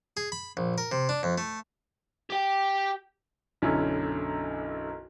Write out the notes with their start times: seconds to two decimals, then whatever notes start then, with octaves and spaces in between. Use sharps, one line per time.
0.17 G#4
0.32 B5
0.57 A#1
0.78 A#4
0.92 C3
1.09 D4
1.23 F2
1.38 A3
2.30 G4 G5
3.62 B1 F#2 D3 C#4 E4